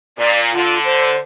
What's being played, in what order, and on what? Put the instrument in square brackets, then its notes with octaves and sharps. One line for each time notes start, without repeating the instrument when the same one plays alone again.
[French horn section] A#2 [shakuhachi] D5
[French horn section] D3 [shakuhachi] F4
[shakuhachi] C5